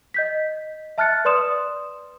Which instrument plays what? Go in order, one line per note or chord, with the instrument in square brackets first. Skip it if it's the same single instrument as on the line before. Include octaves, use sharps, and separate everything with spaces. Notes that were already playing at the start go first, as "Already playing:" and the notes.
[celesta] D#5 G6 B6
E5 A5 F6 F#6 A6 C#7
B4 D5 C6 D#6 E7